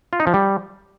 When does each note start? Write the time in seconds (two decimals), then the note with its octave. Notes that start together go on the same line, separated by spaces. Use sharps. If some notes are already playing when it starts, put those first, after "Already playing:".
0.13 F4
0.20 D#4
0.27 F3
0.34 G3